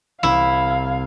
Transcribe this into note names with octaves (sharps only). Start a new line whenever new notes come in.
C2 E4 F5